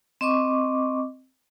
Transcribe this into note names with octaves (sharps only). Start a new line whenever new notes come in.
C4 D#5 C#6 D6